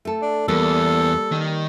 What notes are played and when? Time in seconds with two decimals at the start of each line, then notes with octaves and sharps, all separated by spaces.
0.05 A3 A4
0.22 D4
0.48 E2 G3 A#3 A4
1.32 D#3